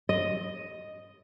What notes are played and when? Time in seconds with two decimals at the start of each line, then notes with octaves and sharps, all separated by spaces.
0.09 D#5